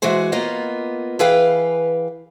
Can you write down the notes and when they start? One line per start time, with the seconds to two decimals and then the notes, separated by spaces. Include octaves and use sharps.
0.02 E3 G#3 F#4 G#4 C5
0.32 A#3 B3 F4 D#5
1.19 E3 G#4 B4 F5 G5